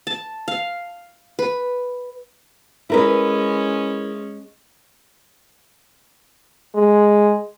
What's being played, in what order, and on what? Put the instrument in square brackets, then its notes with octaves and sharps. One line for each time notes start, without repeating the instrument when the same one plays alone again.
[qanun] A5
F5
B4
[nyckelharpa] G#3 C#4 [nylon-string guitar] E4 A#4 B4
[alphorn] G#3